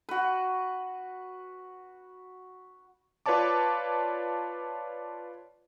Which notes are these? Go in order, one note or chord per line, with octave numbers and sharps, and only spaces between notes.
F#4 B4
F4 B4 C#5 D5 A5 D6